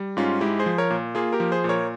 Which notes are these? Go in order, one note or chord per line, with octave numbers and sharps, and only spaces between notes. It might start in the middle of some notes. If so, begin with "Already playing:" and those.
Already playing: G3
G#2 C#4 F4
G#3 E4 G4
G#4 C5
F3
A#4 C#5
A#2
A#3 F4 G#4
G4 A#4
F3
G#4 C5
A#2
A#4 C#5